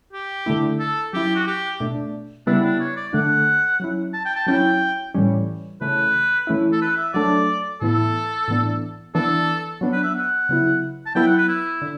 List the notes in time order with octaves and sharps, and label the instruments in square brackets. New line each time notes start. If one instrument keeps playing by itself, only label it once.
[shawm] G4
[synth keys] D3 A3 E4
[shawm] A4
[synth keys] F#3 C#4 E4 [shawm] G4
[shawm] F#4
G4
[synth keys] B2 A3 D4
[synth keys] C#3 G3 B3 E4 [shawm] D4
[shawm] D4
C#5
D5
[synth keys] D3 A3 D4 [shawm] F#5
[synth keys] F#3 C#4 E4
[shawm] A5
G5
A5
[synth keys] F#3 C#4 E4 [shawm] G5
[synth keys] A2 E3 G3 C#4
[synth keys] C#3 E3 A3 C#4 [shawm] B4
[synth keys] E3 A3 C#4 E4
[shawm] A4
B4
E5
[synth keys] F#3 A3 D4 [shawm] D5
[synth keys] A2 E3 B3 E4 [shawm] A4
[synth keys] A2 E3 B3 D4
[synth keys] E3 B3 D4 [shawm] A4
[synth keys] F#3 B3 D4
[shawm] B4
E5
F#5
[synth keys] C#3 F#3 B3 E4
[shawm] A5
[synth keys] F#3 B3 E4 [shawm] G5
[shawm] F#5
B4
E4
[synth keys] D3